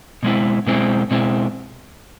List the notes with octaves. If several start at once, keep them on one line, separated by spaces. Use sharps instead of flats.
B2 G#3 C4 E4
B2 G#3 C4 E4
B2 G#3 C4 E4